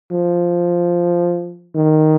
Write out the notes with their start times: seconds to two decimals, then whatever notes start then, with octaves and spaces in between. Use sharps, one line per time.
0.11 F3
1.75 D#3